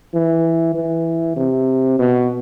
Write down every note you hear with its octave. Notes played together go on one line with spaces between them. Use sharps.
E3
E3
C3
B2